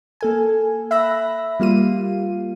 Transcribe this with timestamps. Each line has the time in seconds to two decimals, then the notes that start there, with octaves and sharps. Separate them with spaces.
0.21 A#3 A4 G#5
0.91 E5 B5 E6 F#6 A#6
1.60 G3 A#3 F4 D#7